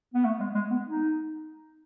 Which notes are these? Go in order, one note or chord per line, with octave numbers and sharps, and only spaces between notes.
B3
A3
G#3
G#3
B3
D#4